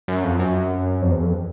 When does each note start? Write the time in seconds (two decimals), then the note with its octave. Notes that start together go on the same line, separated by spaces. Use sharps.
0.08 F#2
0.24 F2
0.39 F#2
1.02 F2
1.11 E2
1.23 F2